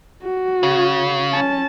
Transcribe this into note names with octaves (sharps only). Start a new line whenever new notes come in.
F#4
C#3
C#4 A5